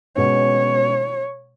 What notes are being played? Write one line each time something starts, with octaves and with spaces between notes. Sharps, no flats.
B2 G#3 C#4 C#5